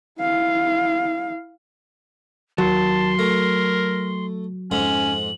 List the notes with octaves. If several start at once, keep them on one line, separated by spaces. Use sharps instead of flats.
E4 F5
D#2 F#3 A5 C6
A3 A#4
F2 G#2 G#3 C#4 F#7